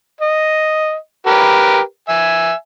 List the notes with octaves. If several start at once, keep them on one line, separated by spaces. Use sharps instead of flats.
D#5
G4 A#4 B4
E5 G#5